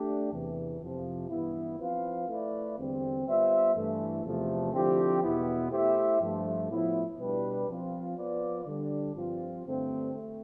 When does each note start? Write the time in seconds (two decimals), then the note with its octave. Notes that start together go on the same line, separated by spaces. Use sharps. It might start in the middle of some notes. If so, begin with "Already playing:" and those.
Already playing: A3 D4 G4
0.31 E2 C3 E3
0.80 F2 C3 F3
1.29 G2 E3 B3 E4
1.79 F3 C4 F4 B4 F5
2.27 A3 E4 B4 D5
2.77 E2 D3 G3 C4
3.26 G3 B3 F4 C5 E5
3.75 G2 E3 A3
4.24 E2 C3 F3 A3
4.73 D3 F3 C4 E4 G4
5.22 E2 B2 B3 E4
5.71 A3 E4 G4 C5 E5
6.21 G2 F3 A3
6.70 A2 F3 B3 E4
7.19 B2 G3 D4 G4 B4
7.68 F3 C4 F4
8.16 F3 B3 F4 B4 D5
8.65 D3 G3 D4
9.15 G2 F3 C4 F4
9.64 G2 D3 A3 C4
10.13 A3